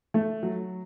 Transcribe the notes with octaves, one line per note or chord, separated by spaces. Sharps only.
A3
F#3